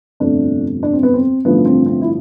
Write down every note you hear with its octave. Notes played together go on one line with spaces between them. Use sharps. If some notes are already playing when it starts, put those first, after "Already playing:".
G1 F2 C3 F3 A3 D4
D4
C4
B3
C4
A1 G2 D3 F3 A3 B3
C4
C4
E4